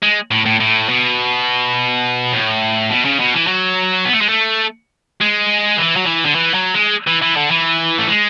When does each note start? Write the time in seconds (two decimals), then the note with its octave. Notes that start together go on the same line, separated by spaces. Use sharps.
0.03 G#3
0.31 A2
0.46 A2
0.60 A2
0.89 B2
2.32 A2
2.90 B2
3.05 C#3
3.20 B2
3.34 E3
3.47 F#3
4.05 B3
4.13 A3
4.21 G#3
4.29 A3
5.21 G#3
5.78 E3
5.97 F#3
6.06 E3
6.25 D3
6.35 E3
6.54 F#3
6.74 G#3
7.07 E3
7.22 E3
7.37 D3
7.51 E3
7.98 A3
8.09 G#3